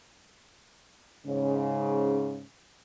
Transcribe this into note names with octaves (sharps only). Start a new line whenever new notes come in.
G#2 C#3